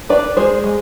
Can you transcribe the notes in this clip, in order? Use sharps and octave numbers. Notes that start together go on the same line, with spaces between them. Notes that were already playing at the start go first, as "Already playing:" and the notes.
D4 B4 D5
G#3 G#4 C5
G#3